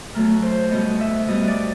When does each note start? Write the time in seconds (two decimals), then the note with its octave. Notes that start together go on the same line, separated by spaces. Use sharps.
0.15 B2 F#3 A3 A#4
0.43 C5
0.71 B2 G3 B3 D#5
1.01 E5
1.28 B2 G3 B3 D#5
1.48 D5